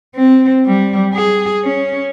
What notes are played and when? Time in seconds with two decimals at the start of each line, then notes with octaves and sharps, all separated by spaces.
0.15 C4
0.66 G3
1.14 G#4
1.64 C#4